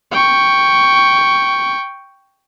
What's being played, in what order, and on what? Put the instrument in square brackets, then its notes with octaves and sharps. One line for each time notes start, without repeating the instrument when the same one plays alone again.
[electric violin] G5 C#6